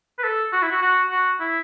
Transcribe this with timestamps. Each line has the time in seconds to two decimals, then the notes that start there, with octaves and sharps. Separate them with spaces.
0.19 B4
0.24 A4
0.52 F#4
0.62 E4
0.72 F#4
0.82 F#4
1.11 F#4
1.40 E4